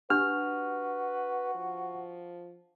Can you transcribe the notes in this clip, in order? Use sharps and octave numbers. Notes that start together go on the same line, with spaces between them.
D4 F#4 G4 B4 F6
F3